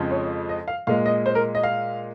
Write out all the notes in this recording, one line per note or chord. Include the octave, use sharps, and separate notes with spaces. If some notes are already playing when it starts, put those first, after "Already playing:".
Already playing: F2 C#3 F3 G#3
C#5
D#5
F5
A#2 G#3 F5
D#5
C5
A#4
D#5
F5